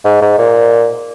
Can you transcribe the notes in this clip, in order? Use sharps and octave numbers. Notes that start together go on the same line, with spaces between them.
G#2
G#2
A#2